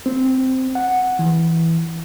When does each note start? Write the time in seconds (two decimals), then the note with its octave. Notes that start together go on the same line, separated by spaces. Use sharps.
0.06 C4
0.75 F#5
1.19 E3